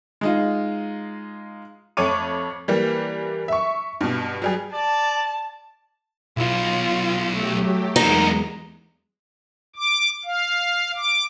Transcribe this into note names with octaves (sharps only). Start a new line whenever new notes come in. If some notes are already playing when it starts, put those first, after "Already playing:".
G#3 D#4 F4
F2 A3 C#5 C#6 D6 D#7
E3 G3 A#3
E5 C#6
G2 B2
F#3 G3 G#4
D5 A5
B1 B2 F4
F#3 A3 G4
E2 G#3 A#3 B3 D#4
D6
F5
D6